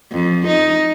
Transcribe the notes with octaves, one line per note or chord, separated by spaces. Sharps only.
F2
D#4